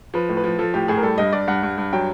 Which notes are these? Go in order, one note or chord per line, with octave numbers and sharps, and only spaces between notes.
F3 B4
A2
B4
F3
F3 A4
A2 G4
A2 G#4
A#4
G3 A4
G2 D#5
G2 D5
G2 F#5
G2
G2
F#3 G5